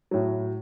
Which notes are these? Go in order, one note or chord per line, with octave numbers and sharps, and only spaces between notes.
A2 F#3